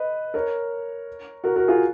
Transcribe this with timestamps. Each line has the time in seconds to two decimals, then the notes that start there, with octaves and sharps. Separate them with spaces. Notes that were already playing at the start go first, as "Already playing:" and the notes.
Already playing: B4 D#5
0.34 A#4 C#5
1.44 F#4 A#4
1.56 F#4 A#4
1.68 F4 G#4